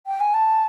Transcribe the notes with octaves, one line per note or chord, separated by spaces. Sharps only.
G5
G#5
A5